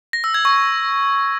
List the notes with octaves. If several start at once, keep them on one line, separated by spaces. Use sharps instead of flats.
A#6
E6
G#6
C#6